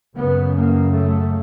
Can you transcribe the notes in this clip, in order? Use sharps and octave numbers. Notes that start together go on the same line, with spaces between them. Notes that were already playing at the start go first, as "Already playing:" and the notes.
F#2 C#3 B3
A#3
A3